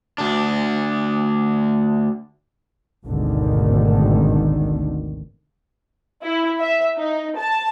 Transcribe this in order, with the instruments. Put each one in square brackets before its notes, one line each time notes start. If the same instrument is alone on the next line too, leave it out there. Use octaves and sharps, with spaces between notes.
[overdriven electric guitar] D2 D4
[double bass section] G#1 D2 B2 D3 D#3
[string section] E4
E5
D#4
A5